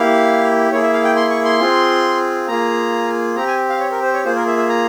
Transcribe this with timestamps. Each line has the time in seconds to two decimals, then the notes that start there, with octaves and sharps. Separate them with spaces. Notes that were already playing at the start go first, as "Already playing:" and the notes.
Already playing: A#3 E4 G4 F5
0.72 A#3 E4 G#4 C#5
0.83 E5
0.93 F5
1.04 G5
1.16 C6
1.30 C#6
1.45 C6
1.59 C4 F4 G#4
2.48 A#3 F4 G#4 A#5
3.36 C4 G4 A#5
3.47 G#5
3.69 F5
3.80 C#5
3.91 A#4
4.02 C5
4.14 C#5
4.24 A#3 F4 G#4 C5
4.36 A#4
4.47 E5
4.57 E5
4.69 A#5